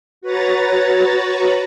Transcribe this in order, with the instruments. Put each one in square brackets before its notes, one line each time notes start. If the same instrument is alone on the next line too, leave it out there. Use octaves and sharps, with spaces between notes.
[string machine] F#4 B4 C#5 A#5 A6